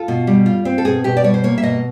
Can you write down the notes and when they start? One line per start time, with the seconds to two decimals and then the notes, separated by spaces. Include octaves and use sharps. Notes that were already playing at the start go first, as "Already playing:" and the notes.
Already playing: F4 A4
0.08 B2
0.27 G3
0.46 F4
0.65 C4
0.78 A4
0.85 B2 G#4
1.04 B2 G4
1.17 D5
1.24 G3 C#5
1.34 C5
1.44 A#3 C#5
1.58 E5
1.63 B2 D#5